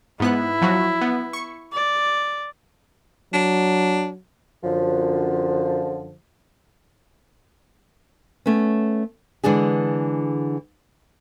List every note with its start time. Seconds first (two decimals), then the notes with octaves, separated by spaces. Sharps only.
0.20 G#2 B3 E4 F#6
0.61 F3 F#3 F#4
1.01 B3
1.33 C#6 C#7
1.73 D5
3.33 F#3 D4
4.64 F#2 D3 F3
8.46 A3 B3 C#4
9.44 D3 E3 G#3 D4 G#4